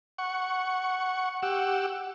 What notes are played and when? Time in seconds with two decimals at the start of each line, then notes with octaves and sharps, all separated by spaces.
0.18 F#5 C#6
1.43 G4 F#5 E6